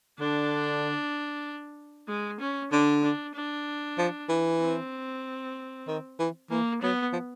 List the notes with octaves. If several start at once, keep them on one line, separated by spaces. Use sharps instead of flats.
D3 D4
G#3
C#4
D3 D4
D4
D4
F3
E3
C4
D#3
E3
E3 A#3
F#3 B3
F3